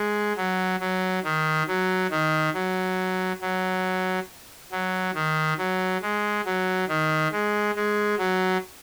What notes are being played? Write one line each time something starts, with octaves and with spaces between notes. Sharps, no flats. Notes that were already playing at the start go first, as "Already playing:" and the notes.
Already playing: G#3
F#3
F#3
D#3
F#3
D#3
F#3
F#3
F#3
D#3
F#3
G#3
F#3
D#3
G#3
G#3
F#3